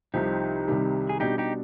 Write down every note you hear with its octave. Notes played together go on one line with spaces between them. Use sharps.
C2 C3 F3 C4 D#4 G4
C2 C3 D#3 G3
G#4
B2 G3 D4 D#4 G4
D#4 G4